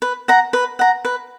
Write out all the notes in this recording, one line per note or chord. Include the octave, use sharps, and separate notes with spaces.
B4
F#5 A#5
B4
F#5 A#5
B4